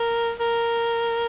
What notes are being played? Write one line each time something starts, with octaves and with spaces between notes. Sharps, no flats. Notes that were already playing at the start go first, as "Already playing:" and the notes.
Already playing: A#4
A#4